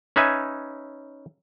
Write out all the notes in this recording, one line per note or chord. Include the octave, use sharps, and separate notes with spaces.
C#4 D#4 B4 E5 G#5